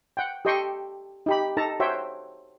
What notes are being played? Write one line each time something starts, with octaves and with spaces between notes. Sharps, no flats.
F#5 G5
G4 A4 D#5 G5 C6 C#6
D#4 G4 B5
D#4 A4 A5 A#5
F#4 C5 C#5 E5 G5